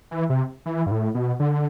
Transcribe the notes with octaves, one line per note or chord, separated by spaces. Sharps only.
E3
C3
E3
G2
A2
B2
D3